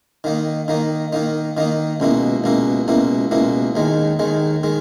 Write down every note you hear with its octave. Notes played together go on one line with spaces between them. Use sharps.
D#3 A#3 D#4
D#3 A#3 D#4
D#3 A#3 D#4
D#3 A#3 D#4
C#2 B2 A#3 E4
C#2 B2 A#3 E4
C#2 B2 A#3 E4
C#2 B2 A#3 E4
D#2 D#3 G#3
D#2 D#3 G#3
D#3 G#3